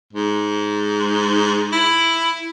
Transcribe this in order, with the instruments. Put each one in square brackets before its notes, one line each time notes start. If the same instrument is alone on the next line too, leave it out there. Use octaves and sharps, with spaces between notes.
[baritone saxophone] G#2
E4